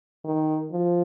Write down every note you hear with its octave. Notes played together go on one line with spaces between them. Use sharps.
D#3
F3